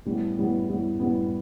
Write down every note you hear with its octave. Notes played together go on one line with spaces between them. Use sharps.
A2 G3 B3
A2 G3 B3
A2 G3 B3
A2 G3 B3